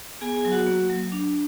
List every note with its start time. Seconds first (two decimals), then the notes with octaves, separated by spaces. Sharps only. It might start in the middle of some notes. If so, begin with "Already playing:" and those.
0.21 B3 G#4 G#5
0.36 G#4 G#5
0.45 F#3
0.51 F#4 F#5
0.67 A#3
0.89 F#3
1.12 D4